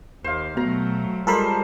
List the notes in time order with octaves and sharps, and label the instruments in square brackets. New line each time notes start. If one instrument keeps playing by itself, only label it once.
[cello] D#2 [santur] C5 F5
[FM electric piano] B2 [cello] F#3 A3 [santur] A#5
[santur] F3 C5 [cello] G3 G#3 [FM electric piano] A4 A#4 B5